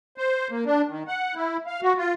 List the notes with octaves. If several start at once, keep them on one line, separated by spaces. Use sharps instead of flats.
C5
A#3
D4
D#3
F#5
E4
F5
F#4
F4